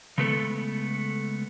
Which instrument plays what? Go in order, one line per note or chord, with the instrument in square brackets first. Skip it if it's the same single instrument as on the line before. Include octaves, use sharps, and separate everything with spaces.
[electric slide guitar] C#3 G#3 A3 B3 A4